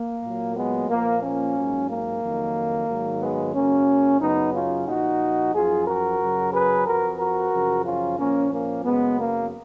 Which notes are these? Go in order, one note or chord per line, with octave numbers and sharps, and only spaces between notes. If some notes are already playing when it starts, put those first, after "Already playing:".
Already playing: A#3
A#2 F#3
G#3 B3
A#2 F3 A#3
A#3 C#4
G#2 F#3
A#3
F2 D#3 F#3
G#2 D#3 F#3
G#3 B3
F#2 C#3 F#3 A#3 C#4
F#2 C#3 F#3 B3 D#4
C#4 F4
A#2 F3 D#4 F#4
F#2 F3 F4 G#4
F#4 A#4
F#2 C#3 F#3
G#4 B4
F2 F3 F#4 A#4
F#4 A#4
F#2 C#3 F3
C#4 F4
A#2 F3 A#3 C#4
A#3 C#4
F#2 C#3 F#3 G#3 B3
A#3